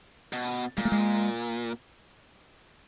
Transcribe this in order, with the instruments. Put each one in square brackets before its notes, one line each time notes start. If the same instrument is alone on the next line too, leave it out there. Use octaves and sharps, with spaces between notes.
[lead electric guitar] B2
[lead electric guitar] A#2 [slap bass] G#3
[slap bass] A3
G#3